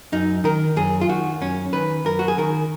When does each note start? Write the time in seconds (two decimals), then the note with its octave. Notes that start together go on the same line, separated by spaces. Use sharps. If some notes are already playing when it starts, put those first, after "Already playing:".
0.12 F#2 D#4
0.44 D#3 A#4
0.76 F#2 G#4
1.01 F4
1.09 D#3 F#4
1.41 F#2 C#4
1.73 D#3 B4
2.06 F#2 A#4
2.19 F#4
2.28 G#4
2.38 D#3 A#4